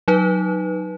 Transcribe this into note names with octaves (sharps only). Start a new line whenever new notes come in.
F#3 D#4 B4